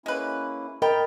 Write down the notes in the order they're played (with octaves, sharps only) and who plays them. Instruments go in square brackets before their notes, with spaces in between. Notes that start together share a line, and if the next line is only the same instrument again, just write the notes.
[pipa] G#3 B4 [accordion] A#3 C#4 E4
[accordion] G#2 [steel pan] A#4 [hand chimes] D#5 B5 [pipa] G5